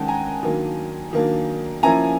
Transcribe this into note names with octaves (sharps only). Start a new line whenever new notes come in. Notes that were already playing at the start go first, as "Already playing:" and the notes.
Already playing: D#3 G#3 C#4 F#5 G5 A5
G#5 A#5
D#3 F#3 A#3 D4
D#3 F#3 A#3 D4
F3 A#3 C#4 E4 G#5 A#5